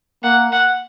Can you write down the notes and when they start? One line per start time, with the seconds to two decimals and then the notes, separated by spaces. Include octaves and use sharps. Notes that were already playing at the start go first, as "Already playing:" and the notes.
0.23 A#3 F#5
0.52 F#5